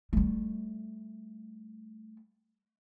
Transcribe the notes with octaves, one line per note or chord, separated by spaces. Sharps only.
G3 A3